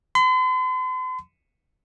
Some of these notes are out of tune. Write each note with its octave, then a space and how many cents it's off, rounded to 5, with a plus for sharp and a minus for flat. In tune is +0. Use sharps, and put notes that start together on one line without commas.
C6 -45